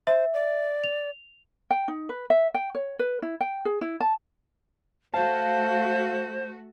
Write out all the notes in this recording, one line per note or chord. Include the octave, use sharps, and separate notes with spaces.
C5 E5
D5
F7
G5
D#4
B4
E5
G5
C#5
B4
E4
G5
G#4
E4
A5
A3 F#4 C5 F5 A5